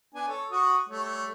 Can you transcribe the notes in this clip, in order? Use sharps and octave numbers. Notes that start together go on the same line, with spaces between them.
B3 D4 G#5
A4 C#5
F#4 C#6 D#6
G3 A3 C#5